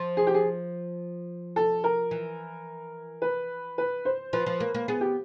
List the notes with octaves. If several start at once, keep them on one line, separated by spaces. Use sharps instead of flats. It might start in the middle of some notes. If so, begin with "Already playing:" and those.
Already playing: F3
G#4
G4
G#4
A4
A#4
E3
B4
B4
C5
F3 B4
F3
A#3
A#3
B3 G#4
G4